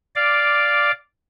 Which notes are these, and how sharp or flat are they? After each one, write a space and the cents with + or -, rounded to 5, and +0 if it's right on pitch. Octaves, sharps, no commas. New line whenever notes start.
D5 -5 F5 +0 D6 +0